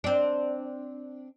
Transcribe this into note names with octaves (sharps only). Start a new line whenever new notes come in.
C4 D4